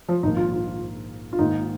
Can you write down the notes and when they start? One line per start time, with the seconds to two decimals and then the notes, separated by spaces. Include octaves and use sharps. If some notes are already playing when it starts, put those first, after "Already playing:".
0.09 F3
0.23 A#1 G#2 D#3 A#3 D#4
0.37 F4
0.52 F4
1.33 F4
1.39 G#2 D#3 A#3 D#4